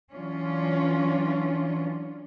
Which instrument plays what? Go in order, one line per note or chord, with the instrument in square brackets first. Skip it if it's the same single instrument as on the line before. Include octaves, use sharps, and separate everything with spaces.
[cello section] E3 F#3 C#4 D4 F4